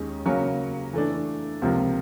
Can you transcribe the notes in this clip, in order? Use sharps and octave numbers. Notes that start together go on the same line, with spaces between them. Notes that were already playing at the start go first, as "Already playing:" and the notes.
Already playing: D#2 D#3 G#3 C#4
C#3 F#3 A#3 C#4
E3 A3 D4
C#2 C3 F3 A#3